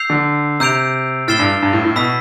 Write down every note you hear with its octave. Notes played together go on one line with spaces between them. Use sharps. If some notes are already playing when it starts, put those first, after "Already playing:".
Already playing: E6 G6 C7 F7
D3
C3 E6 G6 D7 F7
A2 F6 A6 C7 E7 G7
G2
G2
A2
A2
B2 B5 E6 B6